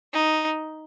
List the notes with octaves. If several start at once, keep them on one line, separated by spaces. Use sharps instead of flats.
D#4